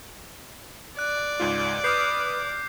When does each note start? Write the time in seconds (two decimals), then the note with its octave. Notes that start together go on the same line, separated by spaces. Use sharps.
0.99 D5 F#6
1.40 C#2 G#2 F4
1.84 B4 D6 D#6 F6 G6 C7